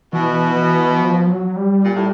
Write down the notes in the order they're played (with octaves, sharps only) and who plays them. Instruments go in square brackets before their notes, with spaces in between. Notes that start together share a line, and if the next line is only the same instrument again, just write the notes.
[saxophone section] B2 [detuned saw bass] E3
[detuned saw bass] E3
F3
F#3
G3
[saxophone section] A#2
A2